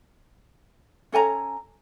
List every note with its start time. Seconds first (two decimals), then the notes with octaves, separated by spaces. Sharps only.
1.12 C#4 A4 G#5 A#5